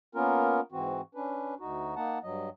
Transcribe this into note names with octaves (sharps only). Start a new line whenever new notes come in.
A#3 B3 C#4 F4 A#4
G#2 E3 C4 F#4
C#4 D4 B4
D2 D#4 F#4
A#3 D#4 F#5 A5
G2 F#3 D#5